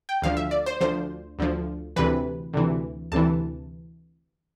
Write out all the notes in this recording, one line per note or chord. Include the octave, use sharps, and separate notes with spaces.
G5
D2 D3 F3 F5
E5
D5
C5
D2 D3 F3 C5
D2 D3 F3
D2 C3 E3 B4
D2 C3 E3
D2 C3 E3 A5